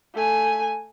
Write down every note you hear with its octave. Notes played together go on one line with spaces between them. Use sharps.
A3 G#5